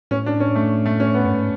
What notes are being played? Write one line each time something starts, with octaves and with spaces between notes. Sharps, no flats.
A2 C#4
D4
C#4
A3
A3
C#4
B3
F#2
G#2